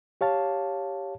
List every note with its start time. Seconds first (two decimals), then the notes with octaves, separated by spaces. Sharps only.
0.21 G4 C#5 F5 A5